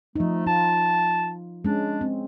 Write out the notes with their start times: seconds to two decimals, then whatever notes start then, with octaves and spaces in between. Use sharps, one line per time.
0.16 F3 A3 D#4
0.46 F4 A5
1.65 G#3 C#4 D4
2.01 C4